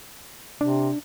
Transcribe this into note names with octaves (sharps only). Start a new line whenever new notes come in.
C3 D4